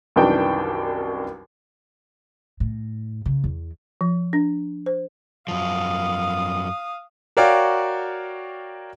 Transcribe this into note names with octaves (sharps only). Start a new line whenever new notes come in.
C2 F#2 D#3 E3 D4 G5
A2
C#3
E2
F3
D4
C5
F#2 F3 F5 D#6
F#4 A#4 C#5 D5 F5 G5